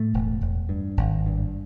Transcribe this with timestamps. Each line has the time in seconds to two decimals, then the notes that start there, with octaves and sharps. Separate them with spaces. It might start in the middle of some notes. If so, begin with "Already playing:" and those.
Already playing: A2 A3
0.14 E1
0.41 E1
0.69 G2
0.97 G#1
1.26 G2